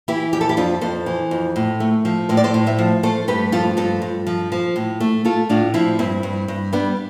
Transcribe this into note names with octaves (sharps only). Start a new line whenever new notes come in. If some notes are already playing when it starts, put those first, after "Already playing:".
E3 E4 G4
F2 G4
A4
E4 G4
F2 D4 F4
F2 A4 C5
E3
F2
A2
A3
F3
A2 C5
D5
A4 C5
A2
C5 E5
F3
A3 A4 C5
G2 G4 B4
F3 F4 A4
G2 F4 A4
G2
F3
F3
A2
A3
A3 F4 A4
A2 D4 F4
F3 C4 E4
G2 C4 E4
G2
G2
G3 B3 D4